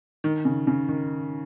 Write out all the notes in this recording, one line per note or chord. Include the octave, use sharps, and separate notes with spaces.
D#3
C#3
C#3
D#3